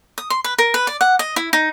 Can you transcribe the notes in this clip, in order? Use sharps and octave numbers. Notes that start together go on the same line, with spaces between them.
D#6
C6
B4
A#4
B4
D5
F#5
D#5
E4
D#4